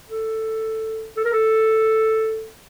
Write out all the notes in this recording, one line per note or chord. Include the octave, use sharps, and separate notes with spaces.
A4
A4
A#4
A4